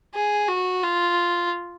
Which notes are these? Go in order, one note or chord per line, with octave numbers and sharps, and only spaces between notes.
G#4
F#4
F4